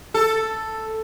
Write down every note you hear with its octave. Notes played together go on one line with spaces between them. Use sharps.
A4